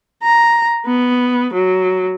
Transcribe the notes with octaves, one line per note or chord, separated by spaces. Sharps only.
A#5
B3
F#3